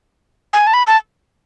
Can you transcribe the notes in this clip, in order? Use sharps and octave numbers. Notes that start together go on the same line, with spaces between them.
G#5
A5
B5
A5